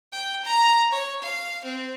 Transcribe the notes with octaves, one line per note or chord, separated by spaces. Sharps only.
G5
A#5
C#5
F5
C4